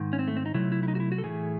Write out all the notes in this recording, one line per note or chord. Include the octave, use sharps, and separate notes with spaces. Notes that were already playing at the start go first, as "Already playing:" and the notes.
Already playing: G#2 D#3
C#4
C4
A3
C4
D#4
C3 F#3 A3 E4
E4
E4
D#4
F#4
E4
F#4
A4
A2 E3 A3 G#4